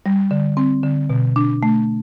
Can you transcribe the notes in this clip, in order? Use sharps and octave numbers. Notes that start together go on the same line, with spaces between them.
G3
D3
C4
D3
B2
D4
A3